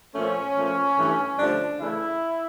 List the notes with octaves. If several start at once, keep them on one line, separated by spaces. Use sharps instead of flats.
A#2 F3 A3 C#4
A#2 F3 A3
G2 E3 A3
G2 D3 F3 A3 D4
C#3 E3 A3 E4